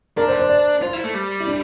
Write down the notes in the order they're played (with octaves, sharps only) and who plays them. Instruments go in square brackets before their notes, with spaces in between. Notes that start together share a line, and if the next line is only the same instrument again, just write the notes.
[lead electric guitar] D4 [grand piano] A#4
[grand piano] C5
C5
D5
[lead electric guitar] F4 [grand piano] C5
[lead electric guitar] E4
A3
G3
[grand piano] E4
D4